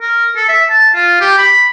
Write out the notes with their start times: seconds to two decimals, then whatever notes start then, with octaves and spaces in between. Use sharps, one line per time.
0.01 A#4
0.36 A4
0.48 E5
0.70 A5
0.94 F4
1.20 G4
1.38 B5